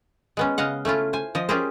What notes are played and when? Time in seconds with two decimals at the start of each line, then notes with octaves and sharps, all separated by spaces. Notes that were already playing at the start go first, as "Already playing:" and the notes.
0.37 G#3 B3 C#4
0.58 C#3 D#5 F5 F#5
0.85 A3 C#4 E4 F4
1.13 C5 G#5
1.35 F3 C5 D#5
1.49 C#4 F4 G4 G#4 A#4 C5